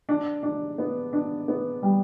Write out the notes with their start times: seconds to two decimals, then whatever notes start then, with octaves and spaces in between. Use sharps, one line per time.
0.09 D4
0.43 D4
0.78 B3
1.13 D4
1.48 B3
1.83 G3